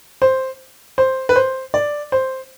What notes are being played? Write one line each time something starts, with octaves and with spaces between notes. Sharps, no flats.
C5
C5
B4
C5
D5
C5